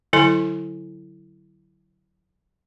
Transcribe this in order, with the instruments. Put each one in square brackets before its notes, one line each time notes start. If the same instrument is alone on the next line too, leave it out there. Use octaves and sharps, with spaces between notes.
[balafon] D3 F#3 E4 A4 G#5 C6